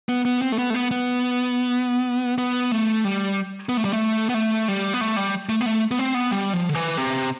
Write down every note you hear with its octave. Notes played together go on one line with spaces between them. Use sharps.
B3
B3
C4
A3
B3
A3
B3
B3
B3
A3
G3
B3
A3
G3
A3
B3
A3
G3
B3
A3
G3
A3
B3
A3
B3
C4
B3
G3
F3
D3
E3
C3